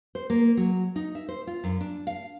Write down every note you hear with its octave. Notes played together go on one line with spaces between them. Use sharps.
C5
A#3
F#3
D#4
E5
C5
F4
F#2
D4
F5